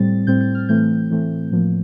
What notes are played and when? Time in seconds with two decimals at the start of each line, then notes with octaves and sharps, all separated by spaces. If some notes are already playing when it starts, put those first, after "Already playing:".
Already playing: A2 G3 C4 A6
0.27 A2 G3 C4 G6
0.41 G6
0.55 F6
0.69 A2 E3 A3 C4 G6
1.10 A2 E3 A3 C4
1.51 A2 F3 A#3